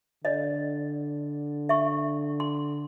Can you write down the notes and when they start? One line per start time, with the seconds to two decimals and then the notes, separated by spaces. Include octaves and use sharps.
0.25 D3 D5 D#5
1.69 E5 C#6
2.40 C6